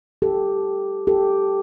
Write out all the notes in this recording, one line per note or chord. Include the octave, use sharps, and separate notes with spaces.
G4 A4
G4 A4